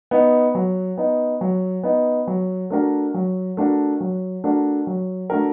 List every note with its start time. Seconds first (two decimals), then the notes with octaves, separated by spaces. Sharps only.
0.11 B3 D#4
0.55 F#3
0.97 B3 D#4
1.41 F#3
1.83 B3 D#4
2.27 F#3
2.70 A3 D4 F#4 A#4
3.14 F#3
3.57 A3 D4 F#4 A#4
4.00 F#3
4.44 A3 D4 F#4 A#4
4.87 F#3
5.30 A3 D4 F#4 A#4